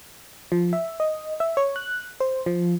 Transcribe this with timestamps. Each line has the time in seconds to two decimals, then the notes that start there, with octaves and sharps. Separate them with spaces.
0.52 F3
0.73 E5
1.00 D#5
1.40 E5
1.57 C#5
1.76 F#6
2.20 C5
2.46 F3